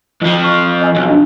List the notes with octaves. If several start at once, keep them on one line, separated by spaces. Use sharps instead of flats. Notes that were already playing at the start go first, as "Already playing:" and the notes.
F2 F3
C#6
D#5 G#5 E6
B1
D4 F4